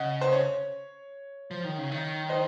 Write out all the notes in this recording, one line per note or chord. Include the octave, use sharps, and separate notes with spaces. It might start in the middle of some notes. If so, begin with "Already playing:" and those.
Already playing: C#3 D#5 F#5
C5
C#5
F3
D#3
C#3
D#3
C5 D#5